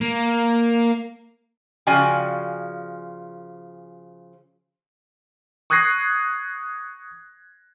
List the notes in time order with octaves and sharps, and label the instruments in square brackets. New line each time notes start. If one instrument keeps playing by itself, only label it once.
[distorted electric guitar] A#3
[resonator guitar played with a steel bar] C#3 F3 F#4 D5 G5 G#5
[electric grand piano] C#6 D#6 F#6 G#6 A#6 C7